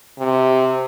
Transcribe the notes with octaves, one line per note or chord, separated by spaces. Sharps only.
C3